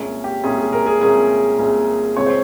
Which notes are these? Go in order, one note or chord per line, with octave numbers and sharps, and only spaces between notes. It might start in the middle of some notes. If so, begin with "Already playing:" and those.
Already playing: C2 A#2 G#3 C#4
G4
C2 A#2 G#3 C#4 G#4
G#4
A#4
G#4
C2 A#2 G#3 C#4 G#4
C2 A#2 G#3 C#4
C#2 C#3 G#3 C4 C#5
C5